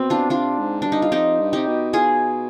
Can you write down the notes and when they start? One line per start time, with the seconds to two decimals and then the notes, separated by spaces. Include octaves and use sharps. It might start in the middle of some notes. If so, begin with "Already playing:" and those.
Already playing: B2 C4
0.10 D4 F4
0.30 C3 D4 F4
0.58 G#2
0.82 G2 D4
0.92 D#4
1.02 F4
1.12 F2 D#4 G4
1.39 G2
1.53 C3 D#4 G4
1.67 B2
1.93 F4 G#4